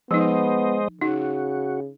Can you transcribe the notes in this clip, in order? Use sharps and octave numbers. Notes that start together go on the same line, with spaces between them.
F3 G#3 B3 D#4 C5 D#5
C#3 D#4 F#4